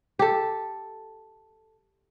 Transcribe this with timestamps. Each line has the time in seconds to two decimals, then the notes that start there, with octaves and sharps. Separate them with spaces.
0.19 G4 A4